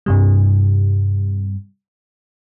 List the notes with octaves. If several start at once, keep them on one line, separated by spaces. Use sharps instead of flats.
G2 C3 G3